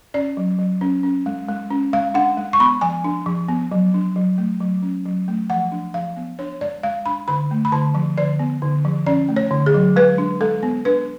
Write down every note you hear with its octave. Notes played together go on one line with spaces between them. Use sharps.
C#4 D5
F#3
F#3
C#4
C#4
G#3
G#3
C#4
G#3 F5
D4 F#5
G#3
C#6
B3 B5
F3 G#5
D4
F3
B3
F#3
D4
F#3
A3
F#3
C#4
F#3
A3
F3 F#5
D4
F3 F5
B3
D4 C#5
G#3 D5
G#3 F5
D4 B5
D3 B5
A3
B5
D3 A5
F3
D3 D5
B3
D3
F3
C#4 D5
A3
C#5
D3
G#4
F#3
G#3 B4
D4
G#3 A4
B3
D4 B4